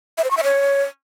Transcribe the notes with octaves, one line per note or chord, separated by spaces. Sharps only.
E5
C5
C#6
E5
C#5